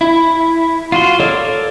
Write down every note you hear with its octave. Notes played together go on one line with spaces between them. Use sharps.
E4
F4 F#4 C6
A4 A#4 C#5 D5